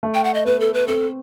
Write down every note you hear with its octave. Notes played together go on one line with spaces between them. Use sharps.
A3
G5
F#5
D#5
B3 B4
A4
B4
C4 A4